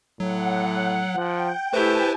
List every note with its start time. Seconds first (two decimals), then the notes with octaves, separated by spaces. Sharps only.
0.20 A2 F#3 F#5
1.15 F3 G5
1.73 A3 E4 G4 B4 C5 G#5 A5